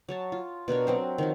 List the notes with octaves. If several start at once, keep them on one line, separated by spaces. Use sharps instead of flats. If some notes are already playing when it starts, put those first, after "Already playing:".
F#3 C#5 A5
F4
B2 D4 A#4 C#5
F#3 C4 C5
D#3 F3 F#3